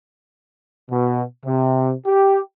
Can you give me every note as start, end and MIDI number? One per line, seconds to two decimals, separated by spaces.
0.89 1.23 47
1.44 1.93 48
2.06 2.39 67